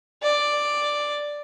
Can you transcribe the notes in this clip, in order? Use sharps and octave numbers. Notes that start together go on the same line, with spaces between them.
D5